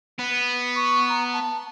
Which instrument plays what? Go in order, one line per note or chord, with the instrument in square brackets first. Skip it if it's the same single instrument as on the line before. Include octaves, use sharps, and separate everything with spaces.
[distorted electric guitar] B3
[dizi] C#6
A#5
A5